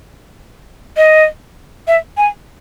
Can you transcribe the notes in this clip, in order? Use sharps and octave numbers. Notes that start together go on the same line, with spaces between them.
D#5
E5
G#5